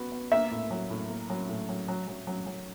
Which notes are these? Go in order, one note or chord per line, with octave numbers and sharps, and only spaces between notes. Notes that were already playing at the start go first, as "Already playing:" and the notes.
Already playing: B3 F#4
B3
A#3 E5
A2
F#3
A2
A#3
F#3
A2
F#3
F#3
F#3
F#3
F#3